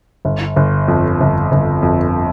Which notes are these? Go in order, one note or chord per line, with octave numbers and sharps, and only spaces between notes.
G1
G1
F2
G1
G1
F2